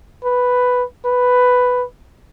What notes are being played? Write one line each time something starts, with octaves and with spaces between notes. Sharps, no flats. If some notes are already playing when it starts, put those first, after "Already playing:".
B4
B4